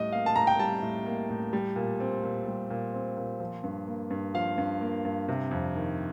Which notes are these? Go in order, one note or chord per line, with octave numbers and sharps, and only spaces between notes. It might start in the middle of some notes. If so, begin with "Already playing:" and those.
Already playing: A2 G3 D#5
A#3 F5
A5
A2 A#5
G5
G3 A5
A2
A#3
A2
G3
A#2
C4
A#2
G3
A#2
C4
A#2
F3
G2
A#3
G2
F3 F5
G2
A#3
G2
C3
F2
D#3